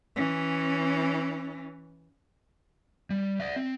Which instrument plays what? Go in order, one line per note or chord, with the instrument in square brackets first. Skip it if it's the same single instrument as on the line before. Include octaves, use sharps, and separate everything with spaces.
[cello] E3 C#4
[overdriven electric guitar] G3
D5 E5
C4